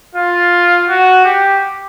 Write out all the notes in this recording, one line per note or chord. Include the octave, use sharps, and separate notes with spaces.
F4
F#4
G4